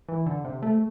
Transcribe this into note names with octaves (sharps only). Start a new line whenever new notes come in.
E3
D3
C3
A3